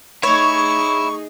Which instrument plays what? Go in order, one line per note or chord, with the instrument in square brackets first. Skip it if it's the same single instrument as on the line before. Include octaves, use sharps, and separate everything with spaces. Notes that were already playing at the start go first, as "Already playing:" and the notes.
[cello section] A3 D#4 G#4 [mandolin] C#5 [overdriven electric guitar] E5 B5 [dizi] C#6